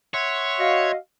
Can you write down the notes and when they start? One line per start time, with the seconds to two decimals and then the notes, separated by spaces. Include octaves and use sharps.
0.14 C#5 E5 F#5 C6
0.60 F#4 D#5 F5